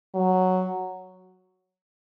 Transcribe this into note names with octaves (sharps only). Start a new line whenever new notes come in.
F#3